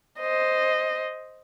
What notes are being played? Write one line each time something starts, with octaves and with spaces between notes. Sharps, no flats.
C5 D#5